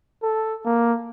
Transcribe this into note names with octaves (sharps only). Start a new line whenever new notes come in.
A4
A#3